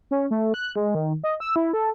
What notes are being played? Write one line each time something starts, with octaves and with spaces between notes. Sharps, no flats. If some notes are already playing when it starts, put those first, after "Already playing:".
C#4
A3
F#6
G#3
D#3
D#5
E6
E4
A4